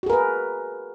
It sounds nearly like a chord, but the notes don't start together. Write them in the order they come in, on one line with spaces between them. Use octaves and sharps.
F#4 G#4 A#4 B4